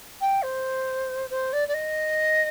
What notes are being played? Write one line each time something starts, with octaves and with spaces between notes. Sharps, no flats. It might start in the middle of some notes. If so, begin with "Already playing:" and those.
G5
C5
C5
D5
D5
D#5